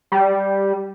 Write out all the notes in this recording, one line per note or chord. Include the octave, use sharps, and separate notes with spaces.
G3